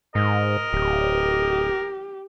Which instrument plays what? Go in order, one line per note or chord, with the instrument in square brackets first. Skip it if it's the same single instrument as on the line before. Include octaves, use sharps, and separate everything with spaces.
[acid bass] G#2 [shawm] A#4 [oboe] D#5
[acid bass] D1 [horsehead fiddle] G4